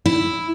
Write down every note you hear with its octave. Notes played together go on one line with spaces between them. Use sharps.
E4